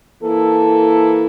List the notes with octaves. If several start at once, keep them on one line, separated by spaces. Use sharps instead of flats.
E3 A#3 E4 A4